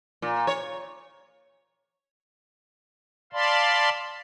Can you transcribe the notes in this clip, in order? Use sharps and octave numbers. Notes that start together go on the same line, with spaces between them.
A#2
C#5
D5 F5 A5 B5 C6